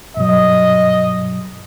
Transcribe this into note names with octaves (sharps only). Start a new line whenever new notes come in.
G2 B2 F#3 D#5